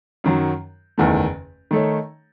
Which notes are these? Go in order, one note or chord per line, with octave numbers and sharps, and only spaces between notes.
F#2 D#3 F#3
F#1 E2 D#3 A3
D#3 A3 D#4 A4 C#5